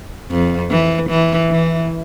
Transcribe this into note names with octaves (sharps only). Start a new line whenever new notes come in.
F2
E3
E3
E3